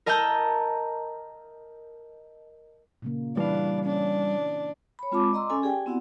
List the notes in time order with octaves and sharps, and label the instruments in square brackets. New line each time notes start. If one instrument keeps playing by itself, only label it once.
[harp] A#4 D#5 A5 A#5 E6 G6
[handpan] A#2 C#3 A#3
[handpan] E3 E4 B4 [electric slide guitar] G3 F5 [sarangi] D4
[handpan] C#4 [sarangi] D4
[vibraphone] C#5 B5
G#3 C4 F4 A5 B5 D6
D5 D#5 A#5 C6 D6 E6
C#4 A4 G#5
G4 G#4 D5 G5 G#5
B3 C4 E4 F#4 D5 F#5